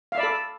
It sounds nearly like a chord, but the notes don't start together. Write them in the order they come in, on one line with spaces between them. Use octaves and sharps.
F5 E5 D5 B5 A4